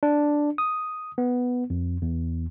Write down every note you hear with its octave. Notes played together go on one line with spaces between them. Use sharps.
D4
D#6
B3
F2
E2